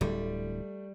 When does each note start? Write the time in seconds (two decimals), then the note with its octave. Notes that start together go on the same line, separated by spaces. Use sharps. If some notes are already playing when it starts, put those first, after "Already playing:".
0.01 D1 D3 G3 A3